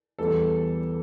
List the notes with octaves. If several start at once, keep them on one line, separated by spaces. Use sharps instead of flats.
E2 E3 G3 A4